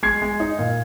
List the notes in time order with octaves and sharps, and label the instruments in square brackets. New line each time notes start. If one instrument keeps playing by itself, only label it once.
[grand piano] G#3 G#6 C7
G#3
D#4
A#2